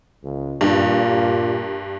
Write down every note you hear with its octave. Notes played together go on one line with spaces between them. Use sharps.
C#2
G2 A#2